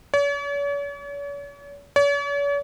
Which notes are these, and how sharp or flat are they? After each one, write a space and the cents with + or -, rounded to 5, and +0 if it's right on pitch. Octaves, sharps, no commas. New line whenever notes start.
C#5 +45
C#5 +45